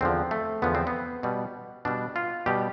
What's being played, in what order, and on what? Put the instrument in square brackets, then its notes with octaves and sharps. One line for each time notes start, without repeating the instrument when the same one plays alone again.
[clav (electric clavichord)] E2 D3 F3 C4
A3
E2 D3 F3 B3
C4
B3
B2 G3
B2 G3 D4
F4
B2 G3 G4